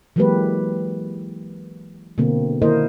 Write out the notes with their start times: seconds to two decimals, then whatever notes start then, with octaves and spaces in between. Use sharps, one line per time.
0.16 E3 F#3 G#3 A#3 G4 B4
2.18 B2 D3 A#3 C4
2.62 D#3 A#3 E4 A#4 C5 D#5